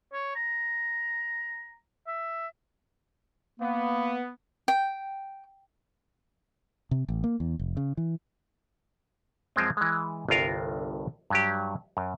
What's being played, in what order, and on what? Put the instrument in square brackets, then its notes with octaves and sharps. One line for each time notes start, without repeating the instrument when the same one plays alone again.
[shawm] C#5
A#5
E5
[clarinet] A#3 [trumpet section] B3
[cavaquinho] G5
[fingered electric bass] C3
A1
A#3
E2
F1
C#3
E3
[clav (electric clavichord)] F#2 F3 G#3 C4
E3 G#3
G1 C2 G2 F4 A#4 F5
G2 F#3 G4
F#2